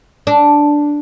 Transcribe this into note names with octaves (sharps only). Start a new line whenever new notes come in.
D4